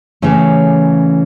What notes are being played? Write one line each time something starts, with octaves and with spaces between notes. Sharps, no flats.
C#3 E3 A3 C#4